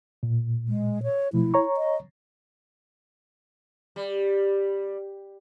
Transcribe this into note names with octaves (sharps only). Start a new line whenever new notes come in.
A#2
G#3
C#5
B2 F3 A3 E4
C#5 A#5 C#6
D#5
G3